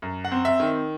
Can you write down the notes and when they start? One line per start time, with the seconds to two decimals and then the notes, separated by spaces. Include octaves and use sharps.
0.02 F#2
0.25 F#5
0.32 C4
0.45 E5
0.60 D#3